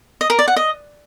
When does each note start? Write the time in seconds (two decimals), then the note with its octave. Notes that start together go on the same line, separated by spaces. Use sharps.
0.21 D#5
0.30 A#4
0.39 D5
0.48 F#5
0.56 D#5